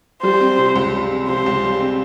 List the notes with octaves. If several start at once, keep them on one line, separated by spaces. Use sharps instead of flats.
G3 C5
C4
C3
C#2
G3
C4
C3 C5
C#2
G3
C4